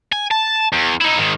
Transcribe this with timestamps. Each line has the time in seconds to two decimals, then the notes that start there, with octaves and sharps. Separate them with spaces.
0.12 G#5
0.31 A5
0.73 E2
1.01 D#4 E4
1.18 G#2 D#3